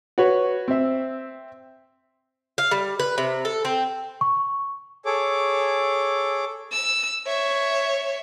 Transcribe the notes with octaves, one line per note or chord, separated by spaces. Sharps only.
F#4 B4 C#5
C4 E5
F5
G3
B4
C3
A4
C4
C#6
G#4 A4 C#5 D6
E6
C#5 E5